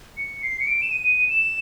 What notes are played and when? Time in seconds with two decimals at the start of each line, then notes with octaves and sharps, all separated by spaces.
0.18 C#7
0.43 C7
0.60 C#7
0.67 D7
0.82 E7
0.91 D#7
1.29 E7